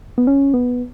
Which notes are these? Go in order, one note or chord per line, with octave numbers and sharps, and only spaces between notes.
B3
C#4
B3